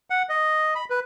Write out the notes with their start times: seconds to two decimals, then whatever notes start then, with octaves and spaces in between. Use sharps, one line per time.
0.10 F#5
0.29 D#5
0.75 B5
0.90 B4